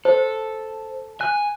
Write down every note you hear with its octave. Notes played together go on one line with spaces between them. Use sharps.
A4 C5
G#5 F#6